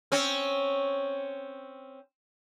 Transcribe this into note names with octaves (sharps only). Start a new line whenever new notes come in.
C4 C#4